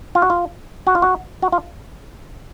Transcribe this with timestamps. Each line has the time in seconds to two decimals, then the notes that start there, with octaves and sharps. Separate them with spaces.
0.15 F4
0.22 F#4
0.30 F4
0.87 F#4
0.95 F4
1.02 F#4
1.42 F#4
1.52 F4